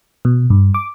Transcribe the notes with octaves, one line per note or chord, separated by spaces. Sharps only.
B2
G2
D6